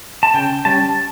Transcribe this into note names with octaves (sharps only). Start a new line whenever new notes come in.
A5
C#3 G5
G3 C#4 A5